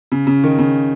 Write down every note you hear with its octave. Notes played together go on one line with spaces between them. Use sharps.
C#3
C#3
D#3
C#3